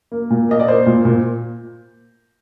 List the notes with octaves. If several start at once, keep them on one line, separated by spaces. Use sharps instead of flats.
A#3
A#2
A#3 D#5
D5
A#3 C5
A#2
A#2